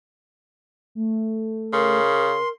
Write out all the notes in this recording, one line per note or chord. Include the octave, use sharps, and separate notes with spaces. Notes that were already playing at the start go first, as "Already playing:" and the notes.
A3
C#3 A#4 C6